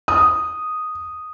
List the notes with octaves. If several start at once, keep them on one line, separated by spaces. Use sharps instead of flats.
D#6